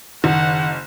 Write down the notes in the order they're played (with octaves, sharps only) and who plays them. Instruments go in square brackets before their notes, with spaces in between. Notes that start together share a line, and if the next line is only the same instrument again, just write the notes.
[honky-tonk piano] F#1 [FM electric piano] D#3 [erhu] F#5